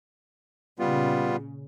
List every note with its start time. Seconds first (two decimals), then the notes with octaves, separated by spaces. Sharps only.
0.79 A#2 C#3 G3 B3 F4